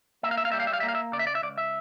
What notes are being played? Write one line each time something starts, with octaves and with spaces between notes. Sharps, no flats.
A#3 E5
F5
E5
F5
G3 E5
F5
E5
F5
E5
A#3
F5
E5
C#3 D5
E5
D5
E5
C#2 D5
E5